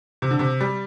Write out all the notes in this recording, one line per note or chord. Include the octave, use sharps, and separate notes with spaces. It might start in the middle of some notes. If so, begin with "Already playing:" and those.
C3
D3
C3
G3